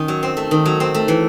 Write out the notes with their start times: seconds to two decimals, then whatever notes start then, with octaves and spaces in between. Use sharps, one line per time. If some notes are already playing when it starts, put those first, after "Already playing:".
Already playing: D#3 C#4
0.08 F#3
0.23 C4
0.37 A3
0.51 D#3
0.66 F#3
0.80 C4
0.94 A3
1.08 E3